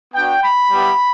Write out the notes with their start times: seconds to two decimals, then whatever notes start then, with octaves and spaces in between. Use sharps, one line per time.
0.14 B3 D4 F#4 G5
0.43 B5
0.71 G3 B3 E4 G4